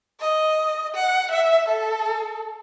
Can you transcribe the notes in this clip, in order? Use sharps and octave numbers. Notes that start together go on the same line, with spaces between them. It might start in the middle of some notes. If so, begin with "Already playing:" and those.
D#5
F#5
E5
A4